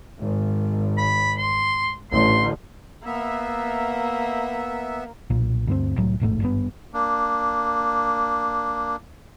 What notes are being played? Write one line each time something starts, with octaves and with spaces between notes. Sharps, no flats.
G#1
B5
C6
A1 D3 C6
A#3 B3 E5
B1 A#2
D2 G2 A#3 C4
C2 A2 F#3
E1 A1 G#2 A3
G#1 G2 D#3 B3
A#3 D4